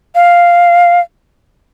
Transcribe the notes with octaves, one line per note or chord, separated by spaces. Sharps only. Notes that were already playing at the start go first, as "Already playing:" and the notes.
F5